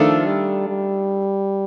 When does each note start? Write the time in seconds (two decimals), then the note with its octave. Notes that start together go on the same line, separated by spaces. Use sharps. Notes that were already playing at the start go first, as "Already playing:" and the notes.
Already playing: D#3 F3 A3 D4 F4 A4
0.27 G3
0.69 G3